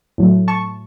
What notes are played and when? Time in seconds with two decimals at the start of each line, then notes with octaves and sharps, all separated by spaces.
0.18 A2 F#3 A3
0.48 A5 C#6